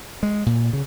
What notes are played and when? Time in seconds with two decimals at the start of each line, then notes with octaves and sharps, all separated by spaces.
0.23 G#3
0.46 A#2
0.73 C#3